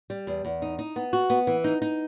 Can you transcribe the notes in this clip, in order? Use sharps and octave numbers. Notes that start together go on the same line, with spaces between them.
G3
E2
E2
D#4
D#4
B3
F#4
B3
E3
D#4
D#4